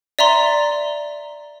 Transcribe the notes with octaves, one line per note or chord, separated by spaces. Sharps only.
D5 E5 A#5 C6